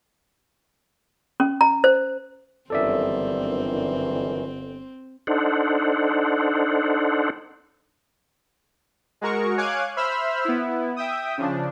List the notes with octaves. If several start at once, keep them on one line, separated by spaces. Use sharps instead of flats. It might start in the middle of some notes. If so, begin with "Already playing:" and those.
C#4
A#5
C5
G1 F#2 D#3 E3 C4 A4 D5 E5
D4 D#4 A4 C5 F#5
G#3 F#4 A#4 C#6
C#5 F5 G#5 D6 F#6 G#6
C5 E5 B5 E6 F6
B3 E4
E5 G5 D#6
C#3 F3 D4